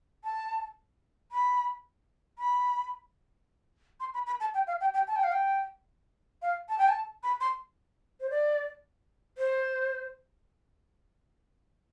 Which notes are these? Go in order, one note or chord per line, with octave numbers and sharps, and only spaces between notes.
A5
B5
B5
C6
B5
B5
A5
G5
F5
G5
G5
A5
G5
F5
G5
F5
A5
G5
A5
B5
C6
C5
D5
C5